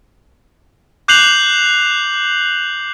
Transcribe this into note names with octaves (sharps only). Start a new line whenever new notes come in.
D6 F#6 G6 C7 F7 F#7